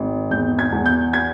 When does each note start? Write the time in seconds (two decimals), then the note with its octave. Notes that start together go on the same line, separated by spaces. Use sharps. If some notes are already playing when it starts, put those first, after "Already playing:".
Already playing: G#1
0.31 E2 G6
0.59 G#6
0.72 E2
0.86 G6
1.13 G#6